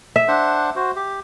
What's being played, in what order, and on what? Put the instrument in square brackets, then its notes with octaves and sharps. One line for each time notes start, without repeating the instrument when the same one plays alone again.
[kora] E5
[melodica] D4 C5 F#5
F#4 C5
G4